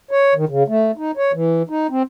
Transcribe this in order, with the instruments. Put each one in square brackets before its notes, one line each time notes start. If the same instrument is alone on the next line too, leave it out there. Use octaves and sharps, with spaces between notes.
[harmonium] C#5
D#3
C#3
A3
D#4
C#5
E3
D#4
C4